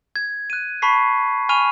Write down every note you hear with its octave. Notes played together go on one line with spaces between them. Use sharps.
G#6
F#6 D#7
A5 B5 C#6 B6 C7
G#5 B5 C#6 F6 D#7 F7